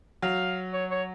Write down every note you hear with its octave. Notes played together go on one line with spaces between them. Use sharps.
F#3 F5
C#5
C#5